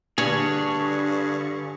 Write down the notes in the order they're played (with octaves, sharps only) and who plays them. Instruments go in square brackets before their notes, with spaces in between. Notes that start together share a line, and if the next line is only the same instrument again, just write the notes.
[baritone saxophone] G2 [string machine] D3 C#6 [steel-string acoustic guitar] D4 [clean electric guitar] G#4 C#5